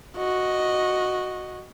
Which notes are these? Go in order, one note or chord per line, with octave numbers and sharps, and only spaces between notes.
F#4 D#5